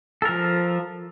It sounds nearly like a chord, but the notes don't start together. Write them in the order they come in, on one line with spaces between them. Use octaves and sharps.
A4 A#4 F3